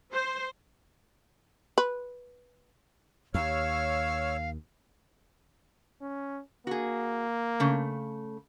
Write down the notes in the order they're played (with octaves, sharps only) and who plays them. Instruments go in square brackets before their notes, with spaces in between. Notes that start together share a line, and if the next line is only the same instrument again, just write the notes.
[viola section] C5
[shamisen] B4
[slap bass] D#2 [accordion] C#5 E6 F6 [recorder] F5
[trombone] C#4
[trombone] A#3 [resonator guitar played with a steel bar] F#4 G#4
[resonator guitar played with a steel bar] C#3 A3